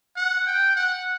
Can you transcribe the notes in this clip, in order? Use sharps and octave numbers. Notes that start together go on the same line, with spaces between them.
F#5
G5
F#5